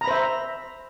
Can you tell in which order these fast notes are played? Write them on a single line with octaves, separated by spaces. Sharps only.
A#5 B5 C5 E5